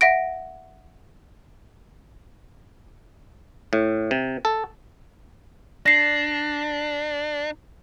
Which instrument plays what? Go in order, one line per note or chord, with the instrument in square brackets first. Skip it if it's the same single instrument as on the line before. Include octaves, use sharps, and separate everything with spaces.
[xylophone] E5 F#5 A#6 D7
[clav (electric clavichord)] A2
C3
A4
[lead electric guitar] D4 [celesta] A#6 C7